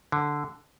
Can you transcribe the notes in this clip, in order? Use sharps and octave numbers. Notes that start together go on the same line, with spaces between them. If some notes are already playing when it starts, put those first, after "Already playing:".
D3